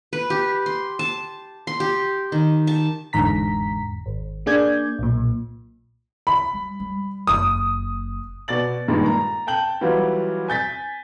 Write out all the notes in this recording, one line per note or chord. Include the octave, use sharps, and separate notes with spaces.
B4
G4
C6
A5
C6
G4
D#3
A5
G1 E2 G#2 D3 A#5 B6
G#1
A#3 D4 G#4 D5 G6 G#6
B1 A#2
B5
G3
G3
F#1 D#6
B2 D5 A6 F#7
G2 A#2 D#3 G#3
A#5
G5 A5 G6 F#7
E3 F#3 G3 F4 F#4
G#5 G6 A6 B6